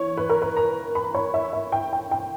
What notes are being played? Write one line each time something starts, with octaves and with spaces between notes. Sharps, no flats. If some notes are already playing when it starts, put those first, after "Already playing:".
Already playing: E3 C#5
B4
A#4
B4
A#5
B5
C#5
E5
E5
G5
G5
G5